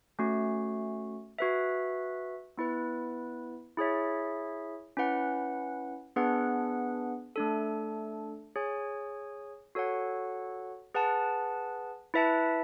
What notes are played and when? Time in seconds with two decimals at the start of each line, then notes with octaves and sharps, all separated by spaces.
0.19 A3 C#4 F#4
1.39 F#4 B4 E5
2.58 B3 E4 B4
3.77 E4 G#4 C#5 E5
4.97 C#4 E4 B4 F#5
6.16 B3 D4 G#4 B4 F#5
7.36 A3 D4 A4
8.56 G#4 C#5 G#5
9.75 F#4 A4 C#5 F#5
10.95 G#4 B4 F#5 A5
12.14 E4 B4 E5 A5